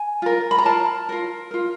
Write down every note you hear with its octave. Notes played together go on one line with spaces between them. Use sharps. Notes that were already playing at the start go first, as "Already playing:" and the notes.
Already playing: G#5
F4 A#4
B5
A#5
F4 A#4 A5
F4 A#4
F4 A#4